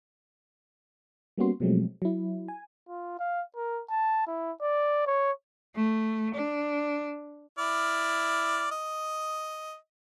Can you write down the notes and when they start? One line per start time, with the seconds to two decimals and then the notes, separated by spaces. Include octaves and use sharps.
1.37 G3 A#3 B3 C#4 F#4 C6
1.60 B2 F3 F#3 G#3 A3 C4
2.02 F#3 E4
2.48 G#5
2.88 F4
3.19 F5
3.56 A#4
3.90 A5
4.27 E4
4.61 D5
5.07 C#5
5.76 A3
6.34 D4
7.58 E4 D5 F6
8.71 D#5